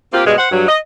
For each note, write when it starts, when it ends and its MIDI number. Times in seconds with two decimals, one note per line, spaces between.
0.14 0.25 58
0.14 0.25 60
0.14 0.25 65
0.14 0.25 67
0.26 0.38 43
0.26 0.38 47
0.26 0.38 56
0.38 0.51 72
0.38 0.51 78
0.52 0.68 43
0.52 0.68 54
0.68 0.78 75